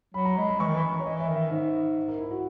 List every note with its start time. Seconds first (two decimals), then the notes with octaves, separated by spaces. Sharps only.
0.14 F#3 B5
0.25 A#5
0.37 G#3 B5
0.48 B5
0.60 E3 C#6
0.67 D#3
0.75 E3 B5
0.90 A#5
1.00 C#5
1.05 E3 D#5
1.20 E5
1.28 D#3
1.36 E5
1.51 G#2
2.08 A#4
2.19 E4
2.31 F#4